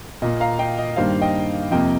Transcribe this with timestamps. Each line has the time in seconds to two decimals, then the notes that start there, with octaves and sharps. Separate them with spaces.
0.22 A#2 A#3 D#5
0.40 F5 A#5
0.59 D#5 G5
0.78 D#5
0.96 G2 D#3 G3 A#3 C5 F5
1.21 D#5 G5
1.71 F2 C3 F3 A#3 D#5 G5